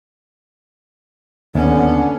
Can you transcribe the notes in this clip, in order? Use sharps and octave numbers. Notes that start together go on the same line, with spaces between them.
D#2 D3 B3 C#4